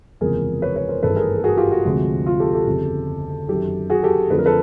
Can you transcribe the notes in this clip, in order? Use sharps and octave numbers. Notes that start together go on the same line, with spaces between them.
F#1 E2 C3 F3 G#3 G#4 A#4
B4 C#5
B4 C#5
A#4 C5
G#1 G2 E3 A3 A4 B4
G#4 A#4
A4
F#4 G#4
F4 G4
F#4
D2 C3 F3 G#3
F4
G4 A4
G4 A4
G1 F2 C#3
F#2 D#3 F#3 G4 A4
F#4 G#4
G4 A4
F2 D3 F3 A3 B4
A#4
A4 B4